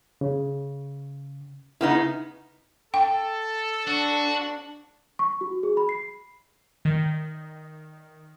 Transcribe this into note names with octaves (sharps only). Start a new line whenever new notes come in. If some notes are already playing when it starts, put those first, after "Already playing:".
C#3
C#3 B3 D#4 E4
A4 G5
D4 F#4
C#6
F#4
G#4
B5
C7
D#3